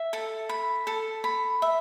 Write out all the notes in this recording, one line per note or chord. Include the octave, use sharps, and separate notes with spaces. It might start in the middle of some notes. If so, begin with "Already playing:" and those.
Already playing: E5
A4
B5
A4
B5
E5